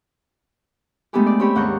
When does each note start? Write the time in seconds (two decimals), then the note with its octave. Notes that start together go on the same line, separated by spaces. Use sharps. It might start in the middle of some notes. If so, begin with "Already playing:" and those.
1.13 G#3 A3 B3 D4 G4 G#4
1.26 D5
1.40 C4 C#4 G4 C#5 B5
1.55 D#2 G#2 F#5 A#5 C#6 G6